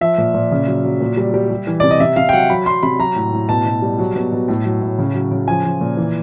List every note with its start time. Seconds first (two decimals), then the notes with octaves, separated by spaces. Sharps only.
0.01 F3 E5
0.18 A#2
0.34 A#2
0.51 C#3
0.68 F#3
0.84 F#3
1.01 A#2
1.17 G3
1.34 G3
1.50 G3
1.67 E3
1.80 C3 D5
1.91 D#5
2.00 C3 E5
2.16 C3 F5
2.29 G5
2.33 F#3 F#5
2.50 F#3 B5
2.66 F#3 C6
2.83 C3 B5
2.99 F#3 A#5
3.16 A2
3.33 A2
3.49 B2 A5
3.66 B2
3.82 G3
3.99 F#3
4.16 B2
4.32 B2
4.48 A2
4.66 F#3
4.82 A2
4.98 C#3
5.15 F#3
5.31 C#3
5.48 F3 G#5
5.65 F3
5.81 A#2
5.97 E3